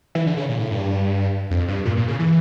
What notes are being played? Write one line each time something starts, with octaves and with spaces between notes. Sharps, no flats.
E3
D3
C#3
A#2
A2
G2
F2
G2
A#2
A#2
C#3
E3